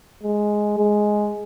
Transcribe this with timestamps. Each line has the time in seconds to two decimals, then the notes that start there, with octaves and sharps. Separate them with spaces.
0.24 G#3
0.78 G#3